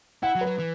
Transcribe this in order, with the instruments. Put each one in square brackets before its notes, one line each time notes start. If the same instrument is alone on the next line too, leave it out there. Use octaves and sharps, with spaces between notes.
[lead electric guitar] E4 [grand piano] F#5
[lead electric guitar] F#3
[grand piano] B4
[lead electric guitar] F#3
E3